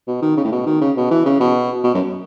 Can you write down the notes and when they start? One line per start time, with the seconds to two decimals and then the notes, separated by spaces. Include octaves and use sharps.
0.08 B2
0.22 D#3
0.37 C#3
0.45 A2
0.52 B2
0.66 D#3
0.81 C#3
0.96 B2
1.11 E3
1.25 C#3
1.40 B2
1.84 B2
1.94 F#2